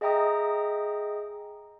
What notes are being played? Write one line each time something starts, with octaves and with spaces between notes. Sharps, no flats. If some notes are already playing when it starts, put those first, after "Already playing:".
G#4 D#5 E5 G5 A#5 D#6